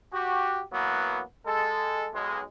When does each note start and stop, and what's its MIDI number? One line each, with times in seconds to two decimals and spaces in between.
0.12 0.61 66
0.12 0.61 67
0.73 1.21 52
0.73 1.21 54
0.73 1.21 58
0.73 1.21 59
1.46 2.08 56
1.46 2.08 69
2.13 2.41 35
2.13 2.41 56